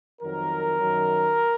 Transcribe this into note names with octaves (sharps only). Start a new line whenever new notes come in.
F2 D#3 F#3 A#4
F#2 D#3 F#3